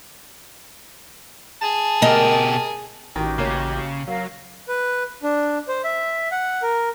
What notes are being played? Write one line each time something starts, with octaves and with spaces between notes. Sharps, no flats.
G#4 A5
B2 G4 A#4 D#5
A1 D#3 F#4 G4 D#5
C#3 A#3 C#4
F#3 A#4 F5
B4
D4
C5
E5
F#5
A#4